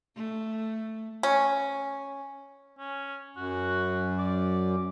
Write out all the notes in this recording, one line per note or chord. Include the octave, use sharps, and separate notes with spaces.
A3
C#4
C#4
F#2 F#4
D5